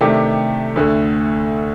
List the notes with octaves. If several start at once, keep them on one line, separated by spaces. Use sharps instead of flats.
C3 D#3 A3 D4 G4
D2 D3 A3